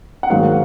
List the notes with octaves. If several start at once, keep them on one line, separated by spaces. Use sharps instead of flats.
F#5
G#2 D#3 F#3 A#3 F5